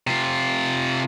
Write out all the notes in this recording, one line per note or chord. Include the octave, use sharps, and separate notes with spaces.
C3 F4